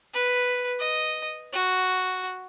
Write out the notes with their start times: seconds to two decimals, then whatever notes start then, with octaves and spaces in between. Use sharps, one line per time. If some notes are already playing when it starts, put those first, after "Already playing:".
0.14 B4
0.80 D#5
1.53 F#4